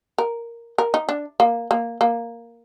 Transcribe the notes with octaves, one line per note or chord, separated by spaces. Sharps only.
A#4
A#4
D#4
D4
A#3
A#3
A#3